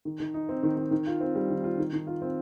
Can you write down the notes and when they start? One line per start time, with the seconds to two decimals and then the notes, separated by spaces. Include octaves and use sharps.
0.05 D#3
0.20 D#3
0.34 D#4
0.49 C4
0.63 D#3
0.77 D#3
0.91 D#3
1.07 F4
1.21 C4
1.35 G3
1.50 D#3
1.64 F4
1.78 D#3
1.93 D#3
2.07 F4
2.22 C4